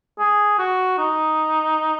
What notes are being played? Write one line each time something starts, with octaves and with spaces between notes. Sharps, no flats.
G#4
F#4
D#4